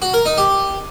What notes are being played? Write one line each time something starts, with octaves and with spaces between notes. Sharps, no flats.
F#4
A#4
D#4
G4